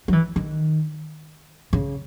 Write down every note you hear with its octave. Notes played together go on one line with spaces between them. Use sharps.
F#3
E3
D#3
C#3